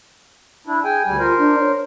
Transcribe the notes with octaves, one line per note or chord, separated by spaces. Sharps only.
D4 E4
G#4 G5 G#5
D2 G3 G5 G#5
F4 A#4 C5
D4
C#5